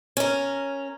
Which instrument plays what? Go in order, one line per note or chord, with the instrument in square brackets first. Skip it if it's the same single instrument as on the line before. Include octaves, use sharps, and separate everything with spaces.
[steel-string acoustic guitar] C#4 A#4